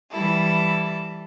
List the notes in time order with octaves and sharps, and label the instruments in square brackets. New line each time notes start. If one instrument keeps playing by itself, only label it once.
[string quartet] E3 G3 E4 A4